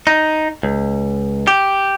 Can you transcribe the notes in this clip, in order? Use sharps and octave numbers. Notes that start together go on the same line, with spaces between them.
D#4
C#2
G4